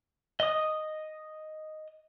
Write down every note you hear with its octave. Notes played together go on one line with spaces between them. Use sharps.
D#5 D#6